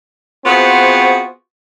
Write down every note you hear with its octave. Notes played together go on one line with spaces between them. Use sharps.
B3 C4 F4 F#4 G#4 C5